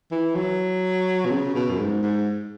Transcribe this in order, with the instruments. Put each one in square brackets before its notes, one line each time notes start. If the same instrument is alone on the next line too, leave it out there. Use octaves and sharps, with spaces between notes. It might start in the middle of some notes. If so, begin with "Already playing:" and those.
[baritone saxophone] E3
F#3
B2
C#3
B2
F#2
G#2
G#2